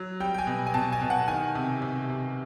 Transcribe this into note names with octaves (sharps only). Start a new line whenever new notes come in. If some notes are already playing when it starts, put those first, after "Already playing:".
Already playing: F#3
G3 G5
G5
G#5
B2
G#5
B2 A5
G#5
B2
F#5
D#3 G#5
C3
C3
C3